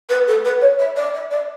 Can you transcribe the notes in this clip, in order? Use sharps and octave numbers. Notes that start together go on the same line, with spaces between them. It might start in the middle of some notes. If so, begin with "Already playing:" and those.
B4
A4
B4
C#5
E5
D5
E5
D5